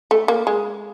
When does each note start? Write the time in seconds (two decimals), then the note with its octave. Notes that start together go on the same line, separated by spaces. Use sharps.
0.11 A3
0.28 A#3
0.47 G#3